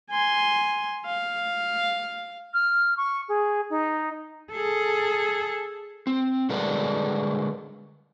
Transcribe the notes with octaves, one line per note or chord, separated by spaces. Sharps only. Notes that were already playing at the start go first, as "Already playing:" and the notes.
G#5 C6
F5
F6
C#6
G#4
D#4
G#4 A4
C4
D3 G3 G#3 D4 A#4 B4